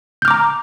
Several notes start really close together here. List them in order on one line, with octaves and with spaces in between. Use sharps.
G6 F6 D6 A#5